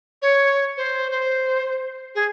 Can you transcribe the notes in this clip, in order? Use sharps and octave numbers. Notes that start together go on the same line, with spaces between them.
C#5
C5
C5
G#4